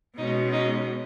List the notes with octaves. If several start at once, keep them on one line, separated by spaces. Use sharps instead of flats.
B2 G#3 C#4 D#4
D#4